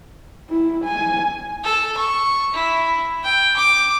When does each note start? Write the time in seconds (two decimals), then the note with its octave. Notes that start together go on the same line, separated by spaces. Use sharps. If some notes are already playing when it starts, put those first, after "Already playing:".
0.50 E4
0.84 G#5
1.64 A4
1.97 C#6
2.53 E4
3.23 G5
3.56 D6